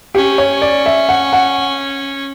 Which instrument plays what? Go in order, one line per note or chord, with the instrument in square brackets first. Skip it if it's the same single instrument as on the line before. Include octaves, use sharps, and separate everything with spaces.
[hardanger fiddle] C#4 [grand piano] G4
[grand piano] C#5
D5
E5
F#5
F#5